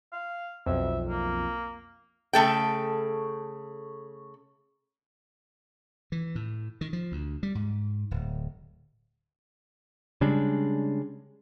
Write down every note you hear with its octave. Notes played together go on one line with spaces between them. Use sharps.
F5
B1 F2 E5
A#3
C#3 A3 A4 G5
E3
A2
D#3
F3
D2
G3
G#2
D1
C#3 G3 G#3 D4